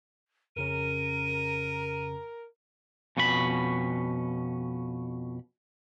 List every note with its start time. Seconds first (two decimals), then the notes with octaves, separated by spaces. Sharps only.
0.56 F2 C#3 C#4 A#4 D#7
3.17 F2 B2 C#4 E4 B5